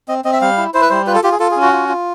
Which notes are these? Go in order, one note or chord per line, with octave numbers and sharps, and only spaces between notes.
C4 D#5
C4 D#5
E5
G3 F5
E4
E4 C5
B4
G3 C5
F4 B4
A4
F4 G4
G#4
F4 A4
G#4
C#4
F#4
F4
F4